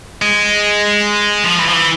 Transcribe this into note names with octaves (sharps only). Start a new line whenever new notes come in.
G#3
F3
E3
F3
E3